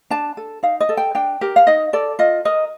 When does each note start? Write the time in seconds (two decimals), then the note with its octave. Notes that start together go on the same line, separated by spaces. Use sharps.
0.10 D4 A5
0.37 A4
0.63 D#4 F5
0.80 D#5
0.89 A4
0.97 G5
1.15 D4 G5
1.41 G4 A#4
1.56 F5
1.67 D#4 D#5
1.93 A4 D5
2.19 F4 D#5
2.45 A#4 D#5